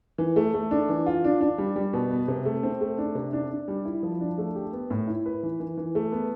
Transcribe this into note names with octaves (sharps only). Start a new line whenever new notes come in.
E3
A3
A3
D4
E3
F4
D4
D4
G3
G3
B2
B3
C3
A3
C4
A3
D4
C3
D4
D4
G3
E4
F3
D4
A3
G4
B3
A2
E4
B4
E3
E3
E3
A3
B3